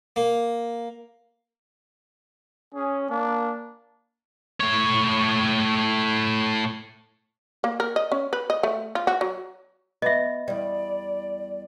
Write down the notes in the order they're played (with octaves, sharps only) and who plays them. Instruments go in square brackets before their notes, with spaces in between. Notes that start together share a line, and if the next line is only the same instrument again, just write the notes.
[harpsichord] A#3
[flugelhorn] C#4 [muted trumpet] G#4
[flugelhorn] A#3 [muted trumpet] D4
[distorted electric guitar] A2 C#5
[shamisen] A#3
A#4
D#5
C#4
B4
D#5
A3
F4
F#4
F#3
[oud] B3 [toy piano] D#5 E5
[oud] E2 G3 [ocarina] D5